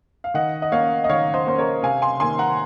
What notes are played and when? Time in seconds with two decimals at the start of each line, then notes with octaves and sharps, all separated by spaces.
0.24 F5
0.34 D#3 D#5 F#5
0.62 D#5
0.72 A#3 C#4 C#5 F5
1.04 D#5
1.09 D#3 C#5 F5
1.34 C5 D#5
1.47 A#3 C#4 C5
1.58 A#4 C#5
1.83 C3 F5 G#5
2.02 G#5 C6
2.20 D#3 A#3 G#5 C6
2.38 F#5 A#5